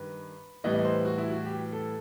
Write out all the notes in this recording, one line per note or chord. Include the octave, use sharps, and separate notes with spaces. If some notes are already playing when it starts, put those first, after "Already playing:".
Already playing: G2 D#3 B4
A2 E3 G3 B3 D#5
D#5
C5
F#4
E4
F#4
G4
A4